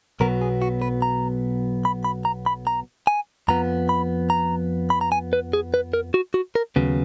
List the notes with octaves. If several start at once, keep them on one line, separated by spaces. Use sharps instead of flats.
B1 B2 F#3 B3 A#4
G#4
F#4
B4
A#5
B5
B5
A#5
B5
A#5
G#5
F2 F3 B3 A#5
B5
A#5
B5
A#5
G#5
B4
G#4
B4
A#4
F#4
F#4
A#4
D#2 C#3 F#3 B3